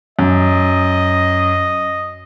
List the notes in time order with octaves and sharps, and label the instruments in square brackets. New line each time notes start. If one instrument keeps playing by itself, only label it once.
[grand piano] F#2 [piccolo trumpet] D#5